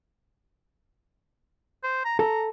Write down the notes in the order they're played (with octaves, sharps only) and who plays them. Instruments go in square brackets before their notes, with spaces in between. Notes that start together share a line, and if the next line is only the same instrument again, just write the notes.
[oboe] C5
A#5
[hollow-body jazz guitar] A4 [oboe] A#5